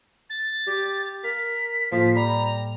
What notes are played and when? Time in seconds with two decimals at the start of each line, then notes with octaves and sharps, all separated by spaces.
0.30 A6
0.67 G4
1.24 A#4 B6
1.92 A2 F3 A#3
2.16 G3 A#5 B5